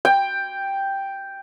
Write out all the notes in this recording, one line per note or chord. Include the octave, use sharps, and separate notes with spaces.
G5